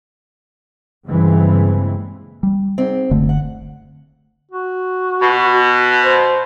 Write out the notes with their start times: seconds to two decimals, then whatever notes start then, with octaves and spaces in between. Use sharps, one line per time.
1.06 G2 C#3 E3 G#3 A#3 C4
2.43 G3
2.78 G#2 C4
3.11 F#1 D3 A3
3.29 F#5
4.51 F#4
5.21 B2
6.04 C5